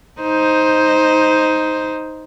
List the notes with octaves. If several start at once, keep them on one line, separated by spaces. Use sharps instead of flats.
D#4 C5